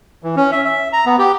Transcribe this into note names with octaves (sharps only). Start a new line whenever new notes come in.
E3
C#4
E5
E5
A#5
B3
G4